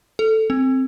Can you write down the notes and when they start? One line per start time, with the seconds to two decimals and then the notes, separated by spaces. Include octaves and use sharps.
0.19 A4
0.50 C4